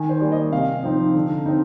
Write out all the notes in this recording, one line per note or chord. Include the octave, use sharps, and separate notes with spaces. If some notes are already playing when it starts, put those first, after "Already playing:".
Already playing: D#3 G#5
C5
G3 A#3 D5
D#5
C3 F5
F3 C4 D#4
D3
C4 D#4